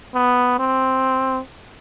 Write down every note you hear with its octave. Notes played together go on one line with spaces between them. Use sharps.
B3
C4